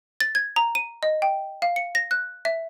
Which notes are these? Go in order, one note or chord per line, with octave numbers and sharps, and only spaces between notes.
A6
G#6
A#5
D#7
D#5
G5
F5
C#7
A#6
F#6
E5